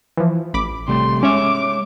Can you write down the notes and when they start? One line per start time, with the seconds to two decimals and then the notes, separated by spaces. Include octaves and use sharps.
0.17 E3 F3
0.54 A1 B5 D6
0.88 C3 G3 A3 C6
1.23 G#3 C#4 C#5 E5 D6